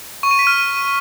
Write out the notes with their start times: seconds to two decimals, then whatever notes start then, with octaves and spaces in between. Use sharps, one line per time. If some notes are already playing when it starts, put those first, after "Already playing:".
0.23 C#6
0.31 D#7
0.39 B6
0.47 F6